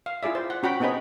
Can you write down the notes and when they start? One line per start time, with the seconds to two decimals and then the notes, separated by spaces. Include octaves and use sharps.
0.06 F5
0.23 E4 F4 G#4 D5 E5
0.35 C5
0.50 F#5
0.63 C#4 F#4 G5 B5
0.80 B3 C4 D#4 G#4 C#5 B5